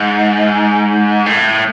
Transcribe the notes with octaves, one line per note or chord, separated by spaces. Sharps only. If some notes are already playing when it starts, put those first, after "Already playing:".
Already playing: G#2
A2